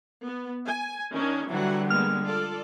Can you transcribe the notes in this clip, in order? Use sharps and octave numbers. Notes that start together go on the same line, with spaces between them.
B3
G#5
D#3 C#4 D4
D3 E3 F#3 G3 F#5
G#3 A#3 B3 F6
F4 A4 D5